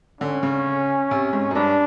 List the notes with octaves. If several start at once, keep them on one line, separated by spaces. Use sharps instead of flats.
D3 C#4
C#3
C3
G#2
F#2
G2 D4